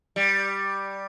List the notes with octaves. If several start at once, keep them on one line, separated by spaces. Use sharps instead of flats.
G3